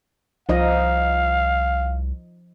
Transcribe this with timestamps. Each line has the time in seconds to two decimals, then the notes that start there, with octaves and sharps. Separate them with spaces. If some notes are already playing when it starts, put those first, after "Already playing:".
0.49 C2 F3 D#4 D#5 F5